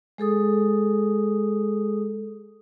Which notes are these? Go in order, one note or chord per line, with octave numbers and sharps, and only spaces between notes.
G#3 G#4 A4 D#6